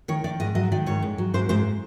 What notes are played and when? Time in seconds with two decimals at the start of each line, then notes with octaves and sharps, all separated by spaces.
0.08 D#3 C#5
0.24 D#3 D5
0.40 G#2 D#5
0.55 F#3 D#5
0.72 D#3 D5
0.86 G#2 C#5
1.02 G#2
1.18 F#3
1.34 G#2 C5
1.49 G#2 C5